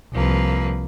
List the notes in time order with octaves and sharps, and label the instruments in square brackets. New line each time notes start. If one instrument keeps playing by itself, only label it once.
[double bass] C2 [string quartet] F3 A#3 B4